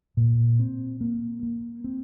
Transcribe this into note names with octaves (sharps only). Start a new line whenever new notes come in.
A#2
C4
A#3
A#3
C4